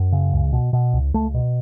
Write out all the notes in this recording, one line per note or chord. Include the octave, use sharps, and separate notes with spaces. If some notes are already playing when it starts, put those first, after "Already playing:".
Already playing: F#2
C#3
C#2
B2
B2
C#2
C#2 A3
B2